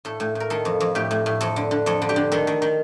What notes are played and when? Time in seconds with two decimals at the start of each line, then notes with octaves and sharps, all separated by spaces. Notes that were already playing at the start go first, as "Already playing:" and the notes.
0.05 A2 A4
0.20 A2
0.35 A2
0.40 A#4
0.50 D#3 A4
0.65 F2
0.80 F2
0.95 A2 G4
1.11 A2
1.26 A2
1.41 F2 A4
1.56 D3
1.71 D3
1.86 F2 A4
2.02 D3
2.09 G4
2.16 D3
2.32 D#3 A4
2.47 D#3
2.62 D#3